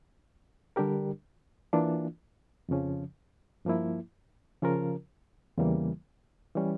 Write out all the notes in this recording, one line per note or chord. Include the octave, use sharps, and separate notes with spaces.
D3 G3 D4 G4 A#4
E3 A#3 D4 F4
F2 C#3 F3 C#4
G2 F3 A#3 E4
C#3 F3 C#4 F4 A#4
E2 C#3 E3 G3 A#3
E3 G3 C#4